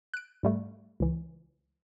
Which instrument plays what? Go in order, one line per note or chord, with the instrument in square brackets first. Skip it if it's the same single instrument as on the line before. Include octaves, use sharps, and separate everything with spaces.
[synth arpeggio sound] F#6 D7
G#2 G3 A3
C#2 E3